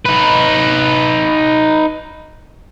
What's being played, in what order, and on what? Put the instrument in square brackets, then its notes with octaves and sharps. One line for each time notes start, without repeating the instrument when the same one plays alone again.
[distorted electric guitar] D#4 B4